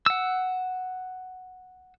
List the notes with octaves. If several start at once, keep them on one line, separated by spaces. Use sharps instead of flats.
F#5 E6